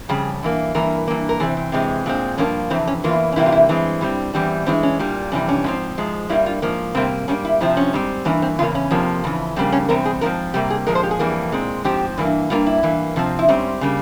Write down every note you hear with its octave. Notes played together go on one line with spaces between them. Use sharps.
F2 C#3 G3 G#4
G2 E3 A#3
G2 E3 A#3 A#4
G2 E3 A#3
A#4
C3 E3 C4 G#4
C4
C3 E3 G#3 C4
A#2 G#3 C4
G2 F3 A#3 C#4
F2 C3 E3 C4
C#4
E2 E3 A#3 F4
C#4
C3 E3 G3 A#3 E4
F4
E4
G2 E3 G#3 C4
G2 G3 C4
E2 E3 G3 C4
G2 E3 G#3 C4
C#4
A#2 G3 A#3
F2 C3 E3 G3 C#4
C#4
G#2 F3 C4
G#2 F3 G#3
G2 G3 A#3 E4
F4
G#2 F3 A#3
C3 G3 A#3 C4
G#2 G3 A#3 C#4
E4
F2 C3 F3 C4 E4
C#4
G#2 G3 C4
G2 E3 A#3 C#4
C4
E2 C#3 E3 A#3 F4
C#4
F2 C3 F3 A#3
F2 C#3 E3
F2 C#3 G3 A#3 C4
C#4
E2 C3 G3 C4 A#4
G#4
G#2 F3 C4 A#4
C3 G3 A#3 G4
G#4
A#2 F3 G#3 A#4
C5
G4
G#4
F2 E3 G3 A#3
A#2 G#3 C4
G#2 F3 C4 G4
G2 E3 A#3
G2 G3 A#3 F4
E4
G2 E3 A#3
C3 F3 C4
E4
G#2 G3 C4 C#4
C#3 G3 A#3